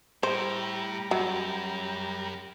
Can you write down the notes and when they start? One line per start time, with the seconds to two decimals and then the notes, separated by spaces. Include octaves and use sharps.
0.23 A2 G3 C5 A#5
1.11 F#2 F#3